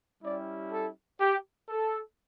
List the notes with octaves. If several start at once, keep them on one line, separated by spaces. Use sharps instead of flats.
G3 C#4 E4 G4 D5
A4
G4
A4